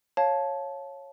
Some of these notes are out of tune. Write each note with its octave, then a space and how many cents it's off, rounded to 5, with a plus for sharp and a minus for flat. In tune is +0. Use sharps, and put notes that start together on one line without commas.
C#5 -10 F5 +0 A5 -15